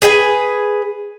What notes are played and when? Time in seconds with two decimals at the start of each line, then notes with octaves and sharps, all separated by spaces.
0.02 G#4 B4 G5 G#5